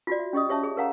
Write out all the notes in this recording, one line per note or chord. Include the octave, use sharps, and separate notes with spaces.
F4 F#4 D5
E5
C#4 G4 D#5 D#6
G4 C#5 E5 A5
G#4
A#4 C#5 F5 F#5 A#5